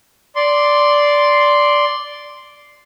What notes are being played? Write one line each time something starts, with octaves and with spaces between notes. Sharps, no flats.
D5 C6